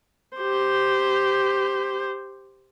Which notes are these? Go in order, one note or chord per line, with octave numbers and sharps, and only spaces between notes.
G4 C5